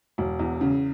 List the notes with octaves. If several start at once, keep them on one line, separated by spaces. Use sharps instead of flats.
E1
E2
C#3